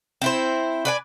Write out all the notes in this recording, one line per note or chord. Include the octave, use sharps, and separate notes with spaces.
C4 E4 C5
B4 D5 G#5